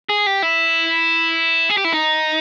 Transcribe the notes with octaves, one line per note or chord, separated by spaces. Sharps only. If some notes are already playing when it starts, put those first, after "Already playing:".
G#4
G4
E4
G#4
G4
E4
D#4